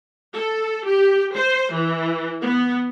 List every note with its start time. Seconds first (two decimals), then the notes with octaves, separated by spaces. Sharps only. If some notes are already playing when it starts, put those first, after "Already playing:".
0.34 A4
0.86 G4
1.36 C5
1.73 E3
2.41 B3